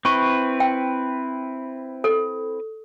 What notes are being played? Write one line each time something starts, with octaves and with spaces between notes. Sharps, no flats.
C4 E4 B4 C#6
G5
A4